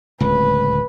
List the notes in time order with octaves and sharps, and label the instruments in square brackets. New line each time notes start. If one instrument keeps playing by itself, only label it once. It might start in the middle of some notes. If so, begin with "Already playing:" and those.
[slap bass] D1 C#2 [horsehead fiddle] B4